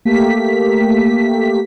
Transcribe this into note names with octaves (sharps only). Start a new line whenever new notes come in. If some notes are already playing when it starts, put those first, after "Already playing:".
A3 A#3 G4 B6